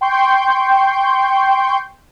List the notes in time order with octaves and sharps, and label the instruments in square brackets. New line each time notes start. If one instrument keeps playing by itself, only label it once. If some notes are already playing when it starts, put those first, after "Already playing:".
[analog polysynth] G5 C6 C#6 G6